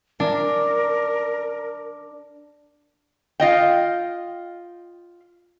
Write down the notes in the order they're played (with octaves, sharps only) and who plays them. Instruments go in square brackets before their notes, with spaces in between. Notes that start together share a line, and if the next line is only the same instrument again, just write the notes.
[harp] D4 [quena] A#4
[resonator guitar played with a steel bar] F4 D#5 G5